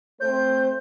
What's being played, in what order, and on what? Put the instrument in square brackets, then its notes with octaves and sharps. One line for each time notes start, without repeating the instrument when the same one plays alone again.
[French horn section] A3 C4 C5 [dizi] G6